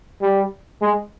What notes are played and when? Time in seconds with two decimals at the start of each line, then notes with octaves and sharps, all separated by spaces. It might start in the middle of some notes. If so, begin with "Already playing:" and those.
0.22 G3
0.82 G#3